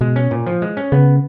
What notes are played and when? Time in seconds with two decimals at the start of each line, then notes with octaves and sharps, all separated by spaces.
0.01 B2 G#3
0.16 C#4
0.31 A#2
0.47 F3
0.62 G#3
0.77 C#4
0.92 C#3 B3